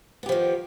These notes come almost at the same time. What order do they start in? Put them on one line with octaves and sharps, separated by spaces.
B3 G4 F3 D#3